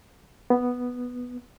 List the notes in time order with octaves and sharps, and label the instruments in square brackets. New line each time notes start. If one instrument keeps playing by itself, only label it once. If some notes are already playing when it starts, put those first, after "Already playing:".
[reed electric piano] B3